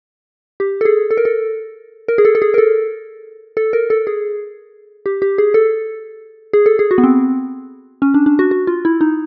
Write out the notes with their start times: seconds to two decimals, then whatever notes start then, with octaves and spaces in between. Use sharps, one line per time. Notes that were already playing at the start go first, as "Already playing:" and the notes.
0.60 G4
0.81 A4
0.85 G#4
1.11 A4
1.17 A#4
1.25 A4
2.08 A#4
2.18 G#4
2.25 A4
2.35 A4
2.42 G#4
2.54 A#4
2.58 A4
3.57 A4
3.73 A#4
3.90 A4
4.07 G#4
5.06 G4
5.22 G4
5.38 G#4
5.54 A4
6.53 G#4
6.66 A4
6.79 G#4
6.91 F#4
6.98 B3
7.04 C4
8.02 C#4
8.14 D4
8.26 D4
8.39 F#4
8.51 F#4
8.67 F4
8.85 E4
9.01 D#4